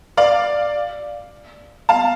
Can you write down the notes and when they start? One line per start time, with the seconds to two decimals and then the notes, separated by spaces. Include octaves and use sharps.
0.17 D5 F5
1.89 F5 A5